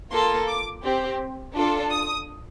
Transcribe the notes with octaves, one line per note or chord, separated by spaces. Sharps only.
A#3 F4 A4 C6
D6
C4 G4
D4 F4 A4
D#6